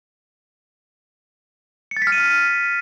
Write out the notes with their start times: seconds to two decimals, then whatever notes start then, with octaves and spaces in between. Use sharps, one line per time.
1.91 C#7
1.97 A6
2.02 B6
2.07 F6
2.12 D#7